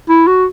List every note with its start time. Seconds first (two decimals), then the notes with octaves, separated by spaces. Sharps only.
0.09 E4
0.27 F#4